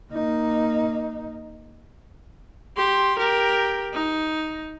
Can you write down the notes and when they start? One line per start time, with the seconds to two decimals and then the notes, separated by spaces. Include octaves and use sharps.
0.13 A#3 D#4
2.77 G4 C6
3.19 G4 A#4
3.93 D#4